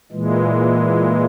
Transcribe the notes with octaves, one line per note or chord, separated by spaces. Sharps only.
A#2 E3 G#3